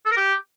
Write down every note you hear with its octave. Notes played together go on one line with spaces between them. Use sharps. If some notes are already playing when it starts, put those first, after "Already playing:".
A4
A#4
G4